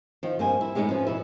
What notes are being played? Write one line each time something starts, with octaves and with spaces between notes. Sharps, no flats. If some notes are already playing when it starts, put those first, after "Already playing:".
D#3 F3
G2 A#3 C4 C5 G#5
E4
A2 G#3 B3 C#4 D#4
F3 C#4 B4
B2 B3 E4